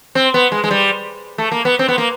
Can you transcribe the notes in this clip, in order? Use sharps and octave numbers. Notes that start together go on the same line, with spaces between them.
C4
B3
G#3
G#3
G3
A3
A#3
B3
C4
B3
A#3